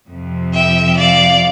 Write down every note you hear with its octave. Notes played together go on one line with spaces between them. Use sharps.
F2 C3 F3
E5 G5
D5 F5